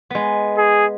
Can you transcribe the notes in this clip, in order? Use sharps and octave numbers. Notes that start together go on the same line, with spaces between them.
G#3 B3
G#4